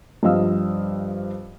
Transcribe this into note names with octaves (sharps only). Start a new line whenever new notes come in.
G2 F3 C4 D#5 F5 E6